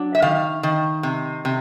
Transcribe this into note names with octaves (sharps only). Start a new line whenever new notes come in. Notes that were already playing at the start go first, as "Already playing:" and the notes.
Already playing: F#3 D4
E5
D#3 F5
D#3
C3
C3